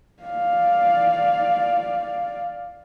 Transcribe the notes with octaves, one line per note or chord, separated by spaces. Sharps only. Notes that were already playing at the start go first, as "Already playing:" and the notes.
D5 F5